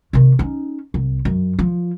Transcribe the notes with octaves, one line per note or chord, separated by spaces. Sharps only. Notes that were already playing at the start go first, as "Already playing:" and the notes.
C3 D#3
C#4 D#4
C2
F#2
F3